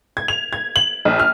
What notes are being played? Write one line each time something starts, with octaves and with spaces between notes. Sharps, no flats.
G#6
F7
G#6
F#7
A#1
F6